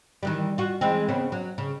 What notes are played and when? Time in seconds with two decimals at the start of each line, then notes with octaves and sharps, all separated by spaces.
0.23 D#3 E3 G3
0.58 F4 F#4
0.81 E3 G#3 C4
1.08 C#3 B3 C4
1.32 F#3
1.58 C#3